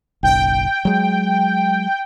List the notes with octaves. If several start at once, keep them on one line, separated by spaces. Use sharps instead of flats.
F#1 B1 G5
F#3 G#3